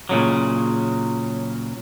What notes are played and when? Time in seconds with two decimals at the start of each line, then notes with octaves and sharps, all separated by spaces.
0.09 A#2 C#3 F#3